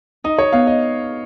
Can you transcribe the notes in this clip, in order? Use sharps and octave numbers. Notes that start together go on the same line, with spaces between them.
D#4 D#5
C#5
B3 F5
D#5